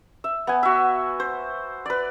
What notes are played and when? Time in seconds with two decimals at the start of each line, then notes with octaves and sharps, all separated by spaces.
0.24 E5
0.47 B3 G#5
0.63 F#4 E5
1.20 C5
1.86 B4 D5